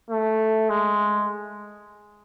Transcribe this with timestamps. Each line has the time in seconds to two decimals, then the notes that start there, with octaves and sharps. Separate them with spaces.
0.10 A3
0.70 G#3